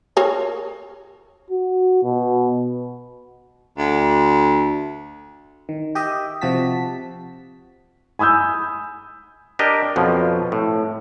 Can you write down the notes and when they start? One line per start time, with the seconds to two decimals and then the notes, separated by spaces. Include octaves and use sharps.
0.17 G#4 A#4 C#5
1.50 F#4
2.03 B2
3.78 D2
5.69 D#3
5.95 G4 D#5 E5
6.41 C3 F3 F#4 A5 B6
8.19 G#5 B5 D#6 E6 G6
9.59 D4 G4 A#4 D#5
9.96 F2 B2 F3 F#3
10.52 A2